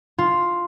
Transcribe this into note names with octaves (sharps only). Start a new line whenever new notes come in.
F4